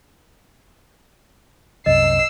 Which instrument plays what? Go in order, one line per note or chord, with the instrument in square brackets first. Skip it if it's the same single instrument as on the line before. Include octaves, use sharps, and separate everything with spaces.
[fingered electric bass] C2 F#2 C3 [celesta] D#5 [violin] E6 C7